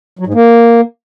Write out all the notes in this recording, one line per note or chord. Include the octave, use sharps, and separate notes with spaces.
F#3
G#2
A#3